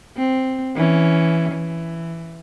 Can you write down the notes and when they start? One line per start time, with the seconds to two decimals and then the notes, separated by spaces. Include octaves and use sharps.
0.17 C4
0.76 E3 C#4
1.52 E3